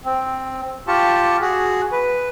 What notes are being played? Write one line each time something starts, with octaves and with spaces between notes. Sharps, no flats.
C4
F4 G4 A5 C#6
F#4 G#4
B4